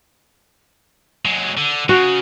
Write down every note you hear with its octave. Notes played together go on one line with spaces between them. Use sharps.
F#3 G#3
D3
C#3 F#4